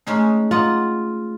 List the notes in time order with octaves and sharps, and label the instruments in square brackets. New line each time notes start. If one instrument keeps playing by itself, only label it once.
[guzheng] G#3 C#4 D#4 [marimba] A3
[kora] F4 [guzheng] D#5 F#5 A#5